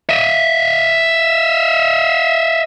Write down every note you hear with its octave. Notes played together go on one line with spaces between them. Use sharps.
D#5 E5